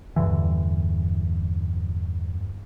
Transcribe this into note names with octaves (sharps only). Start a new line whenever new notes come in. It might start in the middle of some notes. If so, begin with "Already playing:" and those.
E2 G2 D3 E3